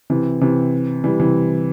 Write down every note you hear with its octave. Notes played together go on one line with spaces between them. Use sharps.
C3 E3
C3 E3
E3 G3
C3 E3